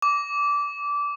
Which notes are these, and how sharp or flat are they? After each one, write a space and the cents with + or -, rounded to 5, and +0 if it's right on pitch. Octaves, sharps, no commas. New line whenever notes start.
D6 -20